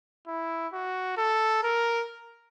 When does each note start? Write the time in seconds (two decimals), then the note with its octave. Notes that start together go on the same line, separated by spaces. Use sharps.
0.27 E4
0.73 F#4
1.17 A4
1.63 A#4